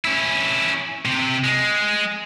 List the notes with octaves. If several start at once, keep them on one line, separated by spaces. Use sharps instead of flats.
C#4 E4
C3
G#3